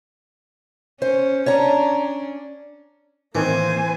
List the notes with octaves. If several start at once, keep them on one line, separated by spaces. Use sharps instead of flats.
C#4 C5
C#4 D4 C#5 A5 A#5
A2 D#3 E3 A#3 C4 C5 G#5